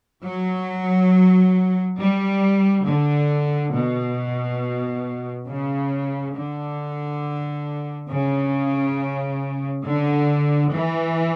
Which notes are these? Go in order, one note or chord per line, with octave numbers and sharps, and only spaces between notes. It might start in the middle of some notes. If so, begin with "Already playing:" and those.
F#3
G3
D3
B2
C#3
D3
C#3
D3
E3